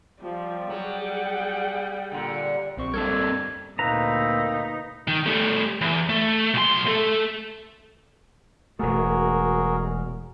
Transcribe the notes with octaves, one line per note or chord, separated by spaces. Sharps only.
F3 G3
F#3 G#4 F#5 G5
A#2 D3
A#1 C4 C#6
G3 C4 D4 A4 A#4 G#6
D2 A#2 A#3 C4 D#4 B4 E5 A#5
D#3
G3 A3
E2
A3
B1 C6
A3 A4
E1 A3 F#4 G#4 A#4